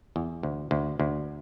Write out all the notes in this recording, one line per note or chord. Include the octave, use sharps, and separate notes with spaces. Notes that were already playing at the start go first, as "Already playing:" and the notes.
E2
D2
D2
D2